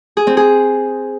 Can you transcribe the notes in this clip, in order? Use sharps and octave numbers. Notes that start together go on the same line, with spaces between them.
G#4
C4
G#4